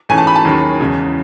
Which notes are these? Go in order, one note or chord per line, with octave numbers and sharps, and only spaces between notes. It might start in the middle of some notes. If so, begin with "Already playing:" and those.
G#2 E3 A3 C#4 G#5
A5
B5
A5
D#2 D#3 F#3 C#4 G#4
E2 C#3 G#3